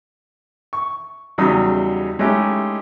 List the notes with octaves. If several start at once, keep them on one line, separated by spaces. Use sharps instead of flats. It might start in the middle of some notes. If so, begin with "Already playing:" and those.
C#6
E2 C#3 F#3 G3 D#4 D#6
G#3 A3 C#4 D#4 E4 G4